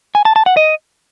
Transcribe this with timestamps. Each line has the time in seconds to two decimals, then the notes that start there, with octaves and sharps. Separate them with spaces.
0.15 G#5
0.25 A5
0.36 A5
0.46 F#5
0.57 D#5